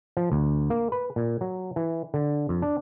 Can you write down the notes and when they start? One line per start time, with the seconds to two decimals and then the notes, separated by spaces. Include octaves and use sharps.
0.17 F3
0.32 D2
0.70 A#3
0.92 B4
1.16 A#2
1.41 F#3
1.76 E3
2.14 D3
2.49 F2
2.62 D4